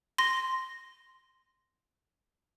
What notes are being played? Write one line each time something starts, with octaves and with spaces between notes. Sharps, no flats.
C6 A#6